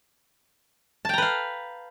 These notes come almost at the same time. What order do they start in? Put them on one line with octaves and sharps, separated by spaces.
A5 G5 A#5 B4 F5